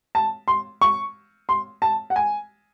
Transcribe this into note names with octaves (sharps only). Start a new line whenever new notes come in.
A5
C6
C#6
C6
A5
F#5
G#5